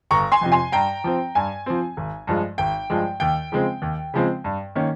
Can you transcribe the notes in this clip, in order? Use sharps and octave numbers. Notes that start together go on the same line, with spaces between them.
G1 A#5 C#6
G#5 C6
F2 C3 F3
G#5 C6
G2 G5 A#5
F3 C4
G2 G#5
F3 C4
G#1
G2 F3 G#3
G#1 G5
G2 F3 G#3
D#2 G5
C#3 F3 G#3 C4
D#2
C#3 F3 G#3 C4
G2
D#3 A#3 C#4